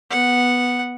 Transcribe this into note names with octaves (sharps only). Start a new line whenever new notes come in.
B3 F#5